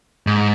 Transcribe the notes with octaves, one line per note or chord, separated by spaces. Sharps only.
G#2